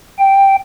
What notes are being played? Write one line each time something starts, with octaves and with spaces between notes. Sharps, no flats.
G5